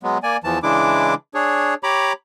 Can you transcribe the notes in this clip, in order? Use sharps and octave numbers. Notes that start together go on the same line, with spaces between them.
F#3 G#3 B3
A#3 D5 G#5
E2 E3 F3 A5
C#3 E3 G#3 D4 E4 D6
D4 G#4 C#5
G4 C#5 A#5 B5 D6